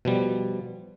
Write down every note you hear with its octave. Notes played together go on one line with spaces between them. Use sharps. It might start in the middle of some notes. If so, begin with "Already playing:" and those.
B2 F3 G3